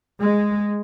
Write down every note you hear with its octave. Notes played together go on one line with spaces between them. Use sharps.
G#3